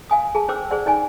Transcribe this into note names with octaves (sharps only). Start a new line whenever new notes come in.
F5 G#5 D#6
G#4 A5
C#4 C5 G5 D6 E6
G#4 C5 D5 F#5
C#4 D#4 D5 G#5